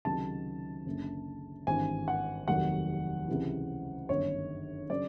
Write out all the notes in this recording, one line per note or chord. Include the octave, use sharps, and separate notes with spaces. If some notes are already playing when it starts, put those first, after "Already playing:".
C#2 C3 D#3 F#3 A5
F#1 F#2 D3
G#1 G2 E3 G#5
F#5
F1 D#2 D#3 F#3 F#5
C#2 C3 E3
G1 F#2 D#3 C#5
C#3 F#3 D5